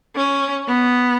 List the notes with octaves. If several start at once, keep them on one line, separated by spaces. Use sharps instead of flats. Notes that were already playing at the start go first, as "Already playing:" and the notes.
C#4
B3